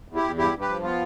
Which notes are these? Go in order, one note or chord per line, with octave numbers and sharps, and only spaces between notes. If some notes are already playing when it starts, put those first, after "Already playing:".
E2
E4 G4
E2
G2 E4 G4
G2
G4 B4
F3
B3 F4